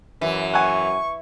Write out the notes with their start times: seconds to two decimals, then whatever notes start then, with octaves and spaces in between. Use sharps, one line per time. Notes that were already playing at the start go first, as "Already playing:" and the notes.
0.21 F#2 E3
0.54 F#5 G#5 C#6